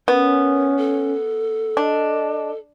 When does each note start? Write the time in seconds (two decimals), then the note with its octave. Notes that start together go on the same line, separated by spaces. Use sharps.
0.08 B3 C#4 A#4
0.77 A4
1.77 D4 D#5